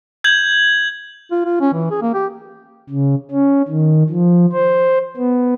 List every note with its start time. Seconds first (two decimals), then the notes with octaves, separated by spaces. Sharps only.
0.24 G6 G#6 F#7
1.32 F4
1.45 F4
1.61 C#4
1.73 E3
1.91 G#4
2.02 A#3
2.14 G4
2.89 C#3
3.31 C#4
3.68 D#3
4.09 F3
4.53 C5
5.17 B3